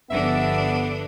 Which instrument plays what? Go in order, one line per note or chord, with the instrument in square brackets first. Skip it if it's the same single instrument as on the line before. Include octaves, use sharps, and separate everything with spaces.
[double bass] G1 F3 [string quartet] D3 D4 [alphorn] B3 [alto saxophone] E5